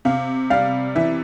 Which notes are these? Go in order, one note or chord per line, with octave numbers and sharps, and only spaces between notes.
C3 F5
G3 F5
E3 E5